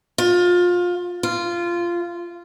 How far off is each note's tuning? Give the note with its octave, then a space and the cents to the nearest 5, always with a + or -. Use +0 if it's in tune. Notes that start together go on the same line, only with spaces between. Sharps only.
F4 +25
F4 -15